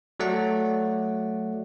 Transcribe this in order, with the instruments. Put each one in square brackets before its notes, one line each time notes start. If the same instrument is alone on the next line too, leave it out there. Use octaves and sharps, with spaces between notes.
[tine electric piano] F#3 A3 D5 F#5